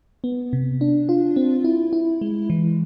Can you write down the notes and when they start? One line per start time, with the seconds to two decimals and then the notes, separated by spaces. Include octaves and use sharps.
0.24 B3
0.53 C3
0.81 D4
1.09 F4
1.36 C4
1.64 E4
1.93 E4
2.21 G#3
2.50 E3